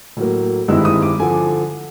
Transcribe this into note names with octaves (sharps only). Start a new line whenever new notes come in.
A2 F#3 A#3
G2 D#3 G#3 C4 E4 E6
D#6
D6
D3 F3 G#5